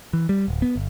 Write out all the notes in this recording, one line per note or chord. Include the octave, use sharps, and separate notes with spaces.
E3
G3
D1
B3
G1